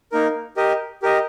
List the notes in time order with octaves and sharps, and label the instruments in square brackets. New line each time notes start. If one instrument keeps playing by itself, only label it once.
[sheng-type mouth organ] A#3 D#4 A#4
G4 A#4 D#5
G4 A#4 D#5